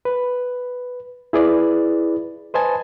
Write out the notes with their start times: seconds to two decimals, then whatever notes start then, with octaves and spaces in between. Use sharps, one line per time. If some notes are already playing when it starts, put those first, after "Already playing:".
0.05 B4
1.33 E4 G#4 B4 D5
2.54 B4 C5 D#5 G#5 A5